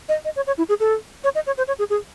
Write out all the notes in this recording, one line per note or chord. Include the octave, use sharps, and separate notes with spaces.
D#5
D#5
C#5
C#5
E4
G#4
A4
C#5
D#5
C#5
C5
C#5
G#4
G#4